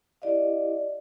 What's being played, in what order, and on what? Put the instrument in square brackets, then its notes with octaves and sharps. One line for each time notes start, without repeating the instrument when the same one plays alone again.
[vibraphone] E4 G4 D5 D#5 F5